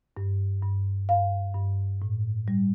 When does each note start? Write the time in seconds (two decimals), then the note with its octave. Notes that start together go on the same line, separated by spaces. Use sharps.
0.17 G2
0.63 G2
1.09 G2 F5
1.55 G2
2.02 A2
2.48 G3